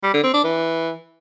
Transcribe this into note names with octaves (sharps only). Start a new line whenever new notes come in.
G3
D3
C4
D4
E3